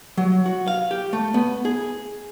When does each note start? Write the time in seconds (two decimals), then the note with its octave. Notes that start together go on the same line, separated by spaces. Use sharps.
0.17 F#3
0.46 F#4
0.68 F5
0.91 G4
1.13 A3
1.34 B3
1.65 G#4